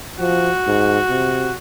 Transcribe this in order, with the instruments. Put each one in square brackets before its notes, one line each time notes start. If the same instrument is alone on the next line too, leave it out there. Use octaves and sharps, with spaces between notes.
[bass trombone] F3 [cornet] F#4
[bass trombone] G#2
C3